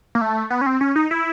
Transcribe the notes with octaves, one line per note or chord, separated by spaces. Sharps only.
A#3
A3
B3
C#4
C4
C#4
D#4
E4